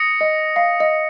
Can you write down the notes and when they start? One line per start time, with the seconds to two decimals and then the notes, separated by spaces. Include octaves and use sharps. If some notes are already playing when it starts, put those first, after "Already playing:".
Already playing: D#6 A#6 C#7
0.21 D#5
0.56 F5
0.80 D#5